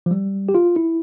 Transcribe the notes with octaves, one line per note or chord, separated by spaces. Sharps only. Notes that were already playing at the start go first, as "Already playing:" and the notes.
F3
G3
G4
F4
E4